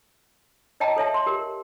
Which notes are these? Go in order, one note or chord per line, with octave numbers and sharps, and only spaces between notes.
C#5 D#5 G5 A5 A#5
A4 C#5 E5 A5
C6
G4 A#4